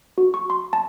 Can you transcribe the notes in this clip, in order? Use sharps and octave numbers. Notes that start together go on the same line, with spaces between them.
F#4
C#6
C6
A5